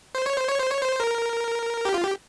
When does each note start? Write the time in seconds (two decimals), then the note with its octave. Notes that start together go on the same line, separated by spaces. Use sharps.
0.15 C5
0.26 C#5
0.37 C5
0.48 C#5
0.59 C5
0.71 C#5
0.81 C5
1.00 A#4
1.85 G4
1.94 F4
2.04 G4